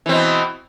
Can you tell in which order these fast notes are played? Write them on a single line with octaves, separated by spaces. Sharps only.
E3 C4 B2